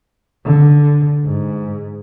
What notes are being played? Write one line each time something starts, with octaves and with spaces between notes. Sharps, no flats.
D3
G#2